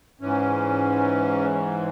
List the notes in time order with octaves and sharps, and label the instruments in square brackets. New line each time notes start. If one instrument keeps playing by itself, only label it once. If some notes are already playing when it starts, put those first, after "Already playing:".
[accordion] G#2 E3 C#4